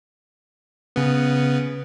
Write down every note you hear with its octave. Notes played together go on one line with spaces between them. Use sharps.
C#3 B3